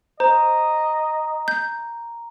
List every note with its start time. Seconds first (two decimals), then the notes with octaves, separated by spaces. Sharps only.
0.20 C5 D#5 A#5
1.48 G6